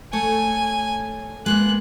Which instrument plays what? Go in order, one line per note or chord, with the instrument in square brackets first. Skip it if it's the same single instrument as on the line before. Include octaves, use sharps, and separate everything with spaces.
[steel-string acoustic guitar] A3 A4 C#5 [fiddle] G#5
[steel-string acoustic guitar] G#3 A#3 B3 [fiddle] F#6